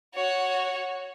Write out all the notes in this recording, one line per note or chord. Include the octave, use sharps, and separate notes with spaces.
F#4 C#5